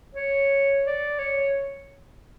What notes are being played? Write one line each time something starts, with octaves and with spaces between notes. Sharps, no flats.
C#5
D5
C#5